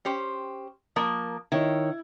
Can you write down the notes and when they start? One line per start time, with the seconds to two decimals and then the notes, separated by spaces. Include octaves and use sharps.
0.05 C#4 G4 C5
0.96 F3 A#3 A#4
1.52 D#3 E4 C#5